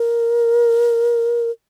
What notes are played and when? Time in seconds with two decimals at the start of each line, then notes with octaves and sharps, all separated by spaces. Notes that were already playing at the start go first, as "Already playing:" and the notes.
Already playing: A#4